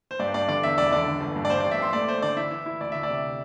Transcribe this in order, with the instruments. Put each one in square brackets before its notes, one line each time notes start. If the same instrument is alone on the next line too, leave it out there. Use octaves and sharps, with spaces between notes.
[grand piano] C5
G2 D5
G2 D5
D3 D5
E2 E5
E1 D5
D3 D5
D3
G1
G2
D5
G2 C5
D5
A1
E5
A1 C6
A3 D5
A3 C5
D3 D5
E4 E5
E3
E4
D2 D5
D2 E5
D5
C3